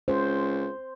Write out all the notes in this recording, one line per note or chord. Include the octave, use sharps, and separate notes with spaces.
C#2 C5